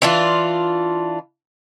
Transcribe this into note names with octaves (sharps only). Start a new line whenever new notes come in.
E3 D4 F4